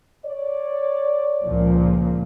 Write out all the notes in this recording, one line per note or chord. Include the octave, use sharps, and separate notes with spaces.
C#5 D5
C#2 A#2 F3